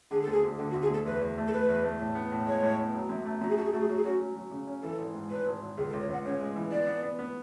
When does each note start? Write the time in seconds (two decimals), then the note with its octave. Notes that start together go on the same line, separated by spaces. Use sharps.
0.11 D3 G#4
0.22 A4
0.27 D2
0.32 G#4
0.43 D2
0.58 D3 A4
0.70 F#4
0.73 D2
0.82 G#4
0.90 D2 A4
1.06 E2 B4
1.21 E2
1.38 A3
1.48 A4
1.52 A3 B4
1.69 E2
1.84 A3
1.99 A2
2.15 B3
2.32 A2
2.47 G#3 C#5
2.63 A2
2.79 B3
2.95 F#3
3.09 F#2
3.26 A3
3.41 F#2 F#4
3.49 G#4
3.57 A3 F#4
3.65 G#4
3.72 A3 F#4
3.80 G#4
3.88 F#3 F#4
3.96 G#4
4.04 C#4 F#4
4.20 F#3
4.36 F#3
4.51 C#3
4.67 C#4
4.82 E3 A4
4.98 G#1
5.14 G#2
5.30 G#1 B4
5.46 G#1
5.62 G#1
5.77 C#2 G#4
5.89 A4
5.93 C#2
6.01 C#5
6.09 C#2 F#5
6.25 C#3 C#5
6.40 G#3
6.56 E3
6.72 B3 D5
6.87 B3
7.03 B3
7.19 B3